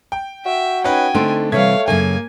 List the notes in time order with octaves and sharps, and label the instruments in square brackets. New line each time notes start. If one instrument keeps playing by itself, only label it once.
[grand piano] G5
[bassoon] F#4 [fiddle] E5
[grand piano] C#4 D#4 B4 [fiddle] G5 G#5
[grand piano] D3 C6 D7 [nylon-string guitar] A3 C4 D#4
[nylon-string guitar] C3 E3 G3 [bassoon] A3 [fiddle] C#5 F5 [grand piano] G#6 B6
[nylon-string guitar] F#2 C#3 A4 [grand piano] A#3 [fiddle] G#5